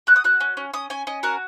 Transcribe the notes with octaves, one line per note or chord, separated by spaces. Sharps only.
F#4 F#6
D#6
F#4 F#6
C#4
C#4
C#4 D#6
C#4 G#5
C#4 D#5
F#4 A#4